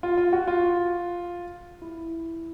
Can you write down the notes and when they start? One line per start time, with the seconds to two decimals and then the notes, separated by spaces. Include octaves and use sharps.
0.03 F4
0.17 F4
0.33 F#4
0.48 F4
1.82 E4